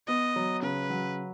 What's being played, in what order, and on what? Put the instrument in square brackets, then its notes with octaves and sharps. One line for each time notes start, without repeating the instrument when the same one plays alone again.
[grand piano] B3 [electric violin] D#5
[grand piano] F#3
[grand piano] C#3 [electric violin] B4
[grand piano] F#3